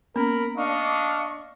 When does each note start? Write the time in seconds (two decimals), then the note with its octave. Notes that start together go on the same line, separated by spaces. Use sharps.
0.16 A#3 B3 C#4 A#4 B5
0.57 D4 D#5 F5 C#6